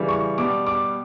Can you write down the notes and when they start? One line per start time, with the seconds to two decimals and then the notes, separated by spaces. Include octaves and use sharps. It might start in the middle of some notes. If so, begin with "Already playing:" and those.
Already playing: C#3 E3 G3
0.09 C#6
0.38 B2 G3 D6
0.67 D6